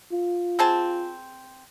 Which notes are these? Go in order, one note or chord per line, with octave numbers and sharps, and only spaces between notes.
F4
C4 G#4 A5